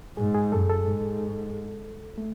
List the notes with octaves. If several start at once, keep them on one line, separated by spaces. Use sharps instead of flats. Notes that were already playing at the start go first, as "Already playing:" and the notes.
G#2 G#4
G#4
F#2 A4
A4
G#2
A3